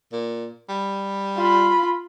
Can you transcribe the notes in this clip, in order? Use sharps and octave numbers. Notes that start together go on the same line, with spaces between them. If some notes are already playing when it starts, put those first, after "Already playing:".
A#2
G3
F4 B5